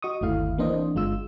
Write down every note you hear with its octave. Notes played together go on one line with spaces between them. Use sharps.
F#4 D#5 C#6 D#6
G1 D#2 A3 E4 F5
E3 A#3 C4 D4 C5 D#5
G1 G#3 F4 E6